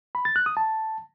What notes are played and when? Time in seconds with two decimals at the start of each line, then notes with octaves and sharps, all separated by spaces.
0.15 B5
0.25 A6
0.36 F#6
0.46 D#6
0.57 A5